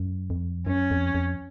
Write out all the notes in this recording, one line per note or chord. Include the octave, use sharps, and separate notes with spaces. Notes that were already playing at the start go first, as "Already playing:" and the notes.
Already playing: F#2
F2
F#2 C#4
F2
F2